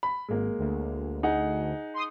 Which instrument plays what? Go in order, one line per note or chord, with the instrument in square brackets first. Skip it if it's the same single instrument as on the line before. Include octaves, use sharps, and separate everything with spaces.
[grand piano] B5
[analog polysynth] G#1 [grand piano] G#3 A#3
[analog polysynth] D2
[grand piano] D#4 G#4 F#5
[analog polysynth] C6 D#6